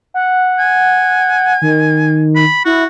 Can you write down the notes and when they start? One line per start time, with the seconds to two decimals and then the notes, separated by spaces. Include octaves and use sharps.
0.14 F#5
0.59 G#5
1.62 D#3
2.36 B5
2.65 E4 F#4